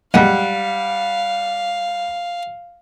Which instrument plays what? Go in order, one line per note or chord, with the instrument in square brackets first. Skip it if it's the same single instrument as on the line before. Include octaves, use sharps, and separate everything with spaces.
[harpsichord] A#1 F#2 G#3 [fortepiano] G3 F#5 [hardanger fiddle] F5